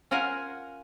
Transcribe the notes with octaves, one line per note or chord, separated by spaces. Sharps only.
C#4 F4 A#4 F#5 G#5